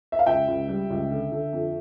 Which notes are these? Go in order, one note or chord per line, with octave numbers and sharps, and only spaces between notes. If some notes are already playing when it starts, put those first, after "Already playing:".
E5
F5
C#2 E5 G5
C#2
G3
C#2
D3
D3
F2